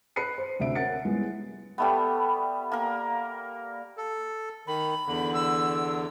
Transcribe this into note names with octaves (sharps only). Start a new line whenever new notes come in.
B4 B5 F#6 C7 C#7 D#7
C5
D2 C3 E5 D7
C#4 A#4 F#5 A6 C#7
G3 G#3 B3 E4 G#4
G3 A3 B3
A#3 A#4
A4
D#3 B5
E2 D3
E6